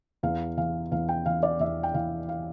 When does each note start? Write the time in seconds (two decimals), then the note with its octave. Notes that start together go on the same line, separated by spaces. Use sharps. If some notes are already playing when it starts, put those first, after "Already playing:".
0.23 E2 F5
0.57 E3 F5
0.92 E2 F5
1.09 G5
1.26 E3 F5
1.43 D5
1.60 E2 E5
1.83 G5
1.94 E3 F5
2.29 F5